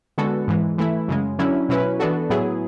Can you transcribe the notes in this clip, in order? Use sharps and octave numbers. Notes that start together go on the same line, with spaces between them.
D3 G#3 B3 F#4 A4
G#2 E3 G#3
E3 A3 E4
F#2 C#3 G#3
D3 F#3 C#4 E4
B2 F#3 C#4 E4 B4
E3 B3 D4 F#4 A4
A2 F#3 B3 E4 G#4